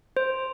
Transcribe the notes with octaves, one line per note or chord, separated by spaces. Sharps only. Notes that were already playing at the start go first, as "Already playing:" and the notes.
C5